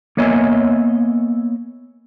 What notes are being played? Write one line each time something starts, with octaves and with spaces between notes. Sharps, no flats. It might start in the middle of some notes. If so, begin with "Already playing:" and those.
A#3 B3 C#5 D#5 E5 G#5